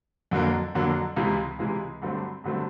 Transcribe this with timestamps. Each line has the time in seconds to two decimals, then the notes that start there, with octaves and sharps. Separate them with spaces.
0.31 F2 D3 F#3 A#3
0.75 F2 D3 F#3 A#3
1.16 C#2 C3 E3 G#3
1.59 C#2 C3 E3 G#3
2.02 G2 D3 F#3 A3 C4
2.44 G2 D3 F#3 A3 C4